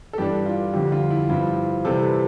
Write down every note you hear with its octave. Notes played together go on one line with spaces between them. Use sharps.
A4
G2 E3 G3 D4 G4
F4
F2 D3 G3 G4
F4
E4
G2 F3 C4 E4 F4
C3 E3 G3 C4 E4 A4
B4